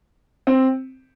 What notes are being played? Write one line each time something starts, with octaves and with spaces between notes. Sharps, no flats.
C4